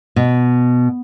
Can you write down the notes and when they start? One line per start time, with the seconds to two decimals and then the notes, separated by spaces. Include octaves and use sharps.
0.16 B2